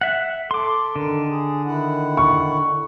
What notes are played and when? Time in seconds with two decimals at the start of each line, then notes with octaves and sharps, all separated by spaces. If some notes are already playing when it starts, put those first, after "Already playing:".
0.01 E5 F#5
0.51 A4 C6 D6
0.96 D3 D#3 A#4
1.28 G#4
1.65 D#3 E4 F#5
2.17 C#6